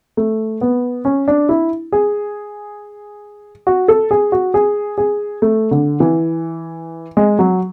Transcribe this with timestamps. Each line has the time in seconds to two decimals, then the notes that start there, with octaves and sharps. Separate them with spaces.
0.17 A3
0.61 B3
1.05 C#4
1.28 D4
1.49 E4
1.92 G#4
3.67 F#4
3.88 A4
4.11 G#4
4.32 F#4
4.54 G#4
4.98 G#4
5.42 A3
5.71 D3
6.00 E3
7.17 G#3
7.39 F#3